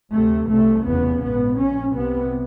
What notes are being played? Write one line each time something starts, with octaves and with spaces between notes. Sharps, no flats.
D2 C3 A3
C2 C3 A3
F1 E2 C#3 B3
A#1 G#2 B3
A#1 A#2 C#4
C2 C3 B3